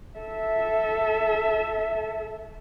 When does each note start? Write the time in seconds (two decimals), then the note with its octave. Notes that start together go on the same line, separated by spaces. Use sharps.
0.19 A4 E5